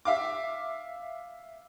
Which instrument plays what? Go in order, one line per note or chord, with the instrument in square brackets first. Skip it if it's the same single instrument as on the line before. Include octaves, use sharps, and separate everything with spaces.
[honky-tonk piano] E5 F5 D6